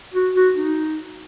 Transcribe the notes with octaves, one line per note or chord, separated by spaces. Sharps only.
F#4
F#4
D#4